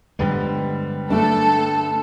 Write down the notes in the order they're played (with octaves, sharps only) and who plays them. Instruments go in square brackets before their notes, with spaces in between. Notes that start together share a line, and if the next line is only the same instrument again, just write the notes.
[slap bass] G2 F3 G#3 [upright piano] D3 G3 B3
[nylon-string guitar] A3 D4 [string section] A4